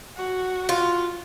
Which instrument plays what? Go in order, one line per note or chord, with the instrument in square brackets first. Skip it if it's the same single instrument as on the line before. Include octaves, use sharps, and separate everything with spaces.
[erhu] F#4
[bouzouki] F4